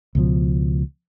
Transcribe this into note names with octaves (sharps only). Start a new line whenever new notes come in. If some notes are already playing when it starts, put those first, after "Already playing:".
C#2 B2 F3